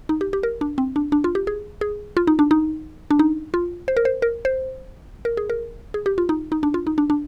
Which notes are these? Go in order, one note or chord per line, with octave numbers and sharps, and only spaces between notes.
D#4
G4
G4
A#4
D4
C4
D4
D4
F4
G4
G#4
G#4
F4
D#4
D4
D#4
D4
D#4
F4
C5
A#4
C5
A#4
C5
A#4
G#4
A#4
G#4
G4
F4
D#4
D#4
D4
F4
D#4
D4
D4